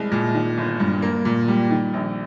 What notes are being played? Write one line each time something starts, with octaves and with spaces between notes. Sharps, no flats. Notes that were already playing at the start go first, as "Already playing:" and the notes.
Already playing: C2 G#3
A#2
D#3
G1
G2
A#3
A#2
G3
D#3
A#1